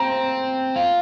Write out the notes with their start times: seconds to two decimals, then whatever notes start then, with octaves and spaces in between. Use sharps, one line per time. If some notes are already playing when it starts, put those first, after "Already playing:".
Already playing: C4 A#5
0.76 F4